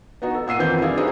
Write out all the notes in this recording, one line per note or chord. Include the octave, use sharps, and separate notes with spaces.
B3 D#4 F#4
A4
A#2 F#5 E6 C7 D#7
F2 D#3 E3 C4 B4 G6
G3 D4 E4 G#4 D5 F5
D#4 E4 F#4 G#4 B4 C5